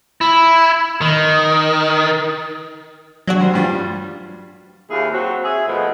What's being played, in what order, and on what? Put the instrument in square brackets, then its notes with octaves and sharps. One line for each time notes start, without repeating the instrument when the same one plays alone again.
[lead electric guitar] E4
D#3
[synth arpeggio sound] F#3 D4 F#4
[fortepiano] G3 C5
G2 G3 F4
[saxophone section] D#2 A2 E4 F4 G#4
F#3 C4 F#4
G#4 E5
B2 F3 G#3 A3 B3